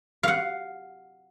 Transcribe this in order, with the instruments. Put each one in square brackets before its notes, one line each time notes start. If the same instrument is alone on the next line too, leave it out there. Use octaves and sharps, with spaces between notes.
[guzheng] F5 F#5